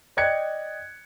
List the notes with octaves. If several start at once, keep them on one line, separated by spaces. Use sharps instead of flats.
D5 D#5 G5 F#6 G#6 C#7